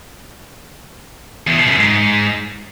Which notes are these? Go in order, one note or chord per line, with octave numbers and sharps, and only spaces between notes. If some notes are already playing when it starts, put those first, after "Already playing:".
E2
B2
F#2
G#2